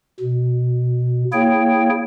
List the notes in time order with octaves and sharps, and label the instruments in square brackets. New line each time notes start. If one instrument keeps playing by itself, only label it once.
[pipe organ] B2
A#3 E4 G#4 C#5 G5